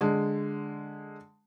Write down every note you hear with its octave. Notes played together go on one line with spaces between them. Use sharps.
D3 G#3